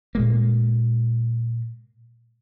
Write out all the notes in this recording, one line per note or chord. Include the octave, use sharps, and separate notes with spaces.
A#2 G#3 A#3